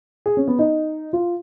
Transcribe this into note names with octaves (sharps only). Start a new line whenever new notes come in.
G#4
C#4
B3
D#4
F4